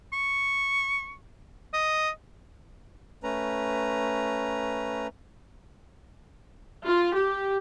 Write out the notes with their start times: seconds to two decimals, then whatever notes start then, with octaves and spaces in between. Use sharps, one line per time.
0.13 C#6
1.74 D#5
3.23 A3 C#4 B4 A#5
6.85 F4
7.17 G4